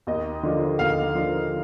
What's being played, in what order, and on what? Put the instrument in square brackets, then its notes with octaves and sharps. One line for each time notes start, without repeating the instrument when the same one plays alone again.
[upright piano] D#2 D#5
D3 F3
D#2 F5
D3 F3